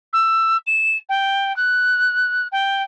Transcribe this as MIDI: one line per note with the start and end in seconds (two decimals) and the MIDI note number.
0.13 0.57 88
0.67 0.97 100
1.09 1.55 79
1.56 2.47 90
2.52 2.82 79